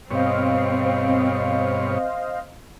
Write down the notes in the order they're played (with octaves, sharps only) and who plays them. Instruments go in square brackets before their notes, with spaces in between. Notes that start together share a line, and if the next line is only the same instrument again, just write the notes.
[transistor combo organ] G2 B2 C#5 [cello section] C4 [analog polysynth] C5 D#5 F5